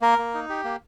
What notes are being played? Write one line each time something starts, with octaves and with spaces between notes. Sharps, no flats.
A#3 A#4
A#3
D#4
G4
A#3